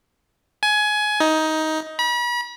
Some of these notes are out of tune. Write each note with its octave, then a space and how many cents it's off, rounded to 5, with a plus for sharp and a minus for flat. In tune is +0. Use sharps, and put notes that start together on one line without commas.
G#5 +20
D#4 +15
B5 -40